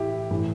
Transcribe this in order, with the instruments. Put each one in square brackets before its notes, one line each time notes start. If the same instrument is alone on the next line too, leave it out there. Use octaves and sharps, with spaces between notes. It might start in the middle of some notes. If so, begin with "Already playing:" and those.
Already playing: [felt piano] A2 E3 E4 G4
A2 E3